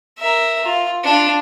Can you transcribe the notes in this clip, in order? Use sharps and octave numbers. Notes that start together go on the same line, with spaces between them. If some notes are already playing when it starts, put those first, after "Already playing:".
A#4 E5
F4
D4 F4